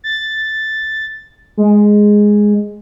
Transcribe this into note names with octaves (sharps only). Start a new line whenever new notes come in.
A6
G#3